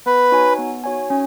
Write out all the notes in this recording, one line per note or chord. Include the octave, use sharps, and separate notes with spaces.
B3 B4
D#4 F#4 C#5 G#5
B3
D#4 F#4 C#5 G#5
C#4